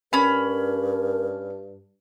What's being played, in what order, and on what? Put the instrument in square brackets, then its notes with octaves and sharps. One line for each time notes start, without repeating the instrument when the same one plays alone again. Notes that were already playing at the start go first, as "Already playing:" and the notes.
[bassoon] G2 [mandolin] C#4 B5 [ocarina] A#4